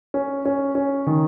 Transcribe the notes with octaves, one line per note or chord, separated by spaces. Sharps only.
C#4
C#4
C#4
D#3